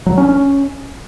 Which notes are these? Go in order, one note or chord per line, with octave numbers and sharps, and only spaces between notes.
F#3
C#4
C#4